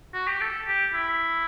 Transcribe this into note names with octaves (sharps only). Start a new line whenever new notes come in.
F#4
G4
A4
G4
E4